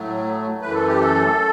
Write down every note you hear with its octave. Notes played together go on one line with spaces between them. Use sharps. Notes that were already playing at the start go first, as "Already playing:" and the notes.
Already playing: A2 F#3 A3
F#2 E3 A3 B4
A4
G4
A4